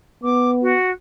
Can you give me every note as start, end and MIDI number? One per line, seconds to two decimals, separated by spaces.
0.24 0.75 59
0.24 0.50 86
0.62 0.90 66